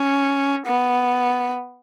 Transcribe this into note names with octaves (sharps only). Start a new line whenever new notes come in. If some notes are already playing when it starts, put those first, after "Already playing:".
Already playing: C#4
B3